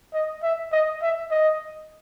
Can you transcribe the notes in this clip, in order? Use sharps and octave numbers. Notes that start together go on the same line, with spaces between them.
D#5
E5
D#5
E5
D#5